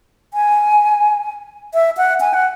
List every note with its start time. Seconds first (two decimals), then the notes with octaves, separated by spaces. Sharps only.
0.34 G#5
1.74 E5
1.97 F#5
2.21 G#5
2.34 F#5